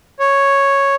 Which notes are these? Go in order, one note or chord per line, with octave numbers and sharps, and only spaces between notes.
C#5